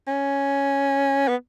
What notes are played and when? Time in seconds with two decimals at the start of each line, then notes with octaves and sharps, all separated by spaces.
0.07 C#4
1.28 B3